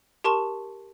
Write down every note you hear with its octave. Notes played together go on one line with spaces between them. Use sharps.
G4 A#4 A5 C6 C#6 E7